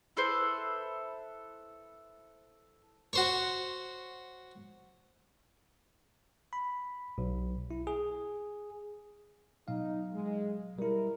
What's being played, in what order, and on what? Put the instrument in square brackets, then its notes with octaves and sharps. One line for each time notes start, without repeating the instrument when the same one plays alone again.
[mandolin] E4 A4 B4 C5
[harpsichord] F#4 C5 C#5
[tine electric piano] B5
B1
E4
G#4
[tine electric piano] B2 F#3 F5 [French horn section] D#4
[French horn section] G#3
[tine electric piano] G3 E4 [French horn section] A#4